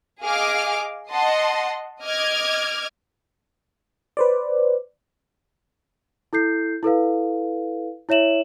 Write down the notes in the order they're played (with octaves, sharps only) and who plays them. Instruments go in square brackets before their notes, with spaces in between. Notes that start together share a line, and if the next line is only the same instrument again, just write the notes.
[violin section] G#4 D#5 F5 G#5 D6 F6
D#5 F#5 A5 C6
D#5 D6 F6 G#6
[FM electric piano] B4 C5 D5
[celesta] E4 A4 G6 C7
E4 A4 B4 F5
E4 C#5 E5 E7 F#7